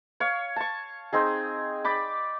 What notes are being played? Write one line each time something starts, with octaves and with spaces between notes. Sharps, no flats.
C#5 F5
A5 C#6
C4 D#4 G#4
D5 G5 B5 D6